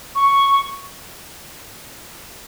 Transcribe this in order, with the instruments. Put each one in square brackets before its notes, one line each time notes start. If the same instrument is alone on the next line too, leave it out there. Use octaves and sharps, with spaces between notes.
[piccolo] C#6